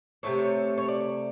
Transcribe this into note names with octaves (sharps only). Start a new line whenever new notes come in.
C3 F3 A3 C4 C#5
C#5
D5